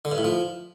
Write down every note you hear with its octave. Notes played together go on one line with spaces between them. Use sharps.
D3
G2
A2
F3